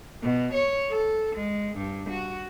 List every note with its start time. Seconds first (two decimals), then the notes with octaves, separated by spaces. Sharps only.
0.23 B2
0.53 C#5
0.90 A4
1.36 G#3
1.77 G2
2.10 F#4